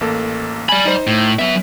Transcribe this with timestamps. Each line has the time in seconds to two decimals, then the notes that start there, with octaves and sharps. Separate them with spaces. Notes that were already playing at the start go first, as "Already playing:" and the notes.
0.01 A1 A#3 A4
0.69 D5 G#5 B5
0.85 D#4 C5
1.07 A2
1.39 F#3 B3 E5